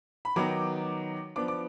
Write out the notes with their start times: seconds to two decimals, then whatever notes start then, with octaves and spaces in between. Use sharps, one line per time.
0.25 B5
0.36 D#3 F#3 B3 D#4 D6
1.36 F3 B3 D4 D6
1.48 D6